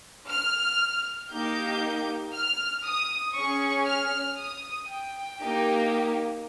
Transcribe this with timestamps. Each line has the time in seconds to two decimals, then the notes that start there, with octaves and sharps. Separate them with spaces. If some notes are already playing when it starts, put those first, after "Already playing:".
0.30 F6
1.32 A#3 D#4 G4 G6
2.33 F6
2.85 D#6
3.35 C#4 G#4 C#6
3.86 F6
4.37 D#6
4.88 G5
5.39 A#3 D#4 G4